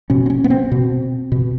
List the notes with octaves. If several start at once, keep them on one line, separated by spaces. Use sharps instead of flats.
B2 C#4
C4
C#4
B3
C4
B2
B2